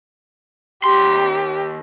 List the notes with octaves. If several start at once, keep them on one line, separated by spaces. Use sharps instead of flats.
D#2 G4 C6